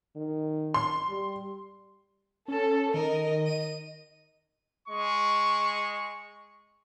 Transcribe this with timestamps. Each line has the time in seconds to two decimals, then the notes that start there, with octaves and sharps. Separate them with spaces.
0.16 D#3
0.74 C6
1.10 G3
2.48 C#4 A4
2.94 D#3 A#4 D#5
3.46 D#7
4.87 G#3 C#6